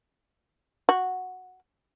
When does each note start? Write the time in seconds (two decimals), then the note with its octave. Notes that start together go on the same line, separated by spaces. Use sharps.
0.89 F#4